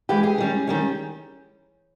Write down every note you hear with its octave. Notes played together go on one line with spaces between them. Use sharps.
E3 G#3 B3 G4
G#4
D#3 G3 C#4
D#3 G3 C#4